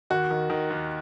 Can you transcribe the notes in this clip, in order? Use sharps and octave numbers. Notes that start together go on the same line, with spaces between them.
D#2 F#4
D#3
D#3
D#2